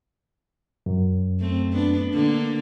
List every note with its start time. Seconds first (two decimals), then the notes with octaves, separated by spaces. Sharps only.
0.86 F#2
1.39 A3 C4
1.72 B3 D4
2.13 D3 A#3